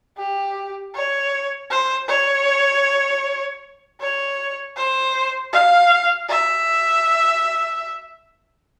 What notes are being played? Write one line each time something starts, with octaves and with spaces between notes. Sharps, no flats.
G4
C#5
C5
C#5
C#5
C5
F5
E5